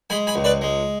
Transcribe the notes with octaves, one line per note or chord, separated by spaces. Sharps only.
G#3 G#5 B5
G#5 B5
C#2
B4 D5
G#3